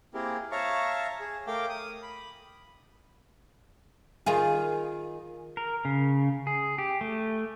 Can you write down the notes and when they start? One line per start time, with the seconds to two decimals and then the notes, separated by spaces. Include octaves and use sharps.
0.14 A#3 C4 E4 G4 G#4 A#4
0.52 C#5 E5 F5 A5 A#5 C#6
1.20 G#4
1.47 A3 A#4 F5 G5 D6
1.69 D#6
2.02 B5
4.26 D#3 F4 G#4
5.57 A#4
5.85 C#3
6.47 G#4
6.78 G4
7.01 A3